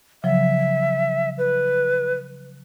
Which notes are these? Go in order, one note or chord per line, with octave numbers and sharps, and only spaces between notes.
C#3 F3 F#3 E5
B4